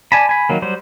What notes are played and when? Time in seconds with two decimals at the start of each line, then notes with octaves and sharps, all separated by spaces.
0.12 D5 G#5 A5 B5
0.29 G#5 B5
0.49 D#3 F#3 A#3
0.62 F#3 G3 C5